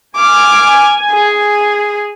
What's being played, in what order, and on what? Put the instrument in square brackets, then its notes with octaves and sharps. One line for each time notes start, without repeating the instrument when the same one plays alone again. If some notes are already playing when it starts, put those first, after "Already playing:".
[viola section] G#5 [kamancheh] D6 F6
[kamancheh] G#4